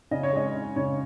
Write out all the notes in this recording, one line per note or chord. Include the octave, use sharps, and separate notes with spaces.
C#3 D#5
C#5
G#3 D#5
C#4
C#3 C#5